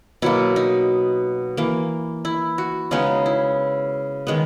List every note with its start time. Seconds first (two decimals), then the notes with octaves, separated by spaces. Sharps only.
0.22 B2 F#3 A#3 E4
0.56 D#4
1.57 E3 A#3
2.25 E4
2.58 F#4
2.91 C#3 G#3 B3 D#4
3.26 E4
4.27 D#3 G#3 B3